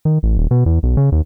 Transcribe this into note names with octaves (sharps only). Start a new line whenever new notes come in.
D#3
A1
D#1
B2
E2
B1
C#3
D#2